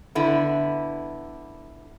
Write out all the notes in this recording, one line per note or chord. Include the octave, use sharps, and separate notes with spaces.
D3 B3 E4